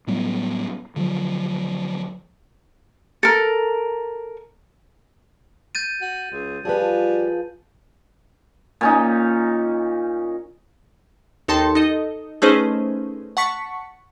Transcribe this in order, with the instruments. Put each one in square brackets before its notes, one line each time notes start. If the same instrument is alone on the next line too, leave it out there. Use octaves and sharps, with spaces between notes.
[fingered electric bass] A2 F#3 G3 B3
D3 F3 F#3
[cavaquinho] A4 A#4
[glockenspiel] G6 A6 D#7
[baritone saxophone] F#4
C#2
[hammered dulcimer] F3 [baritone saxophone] G3 [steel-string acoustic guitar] G#4 B4
[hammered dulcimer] A#2 C#4 D#4
[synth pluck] D#2 D#4 A4 G5 A5 C6
D#4 A4 D#5
A3 C#4 D#4 G#4 B4 C5
F#5 A5 C#6 B6 C#7